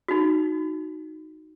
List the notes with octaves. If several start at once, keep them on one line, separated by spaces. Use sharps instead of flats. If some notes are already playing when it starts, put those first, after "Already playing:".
D#4 F#4